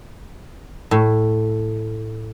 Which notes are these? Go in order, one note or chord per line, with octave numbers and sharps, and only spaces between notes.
A2